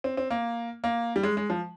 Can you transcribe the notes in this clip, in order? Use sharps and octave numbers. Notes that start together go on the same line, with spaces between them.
C4
C4
A#3
A#3
G3
G#3
G#3
F3